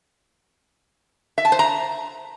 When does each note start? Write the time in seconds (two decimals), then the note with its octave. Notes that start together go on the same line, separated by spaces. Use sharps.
1.38 E5
1.45 A5
1.52 C5
1.59 A#5